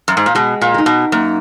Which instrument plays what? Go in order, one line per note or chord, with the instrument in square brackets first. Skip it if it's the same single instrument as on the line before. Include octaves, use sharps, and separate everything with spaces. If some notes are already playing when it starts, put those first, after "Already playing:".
[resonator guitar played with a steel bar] F#2
G#2
A#2
[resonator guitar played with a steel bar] B2 [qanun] G#3
[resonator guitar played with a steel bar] A#2
[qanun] D#4 A#4
[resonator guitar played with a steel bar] B2
[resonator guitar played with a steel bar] F#2 [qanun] A#3